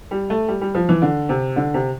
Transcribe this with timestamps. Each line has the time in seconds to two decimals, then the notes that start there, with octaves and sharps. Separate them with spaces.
0.11 G3
0.30 A3
0.48 G3
0.61 G3
0.75 F3
0.89 E3
1.02 D3
1.29 C3
1.56 D3
1.74 C3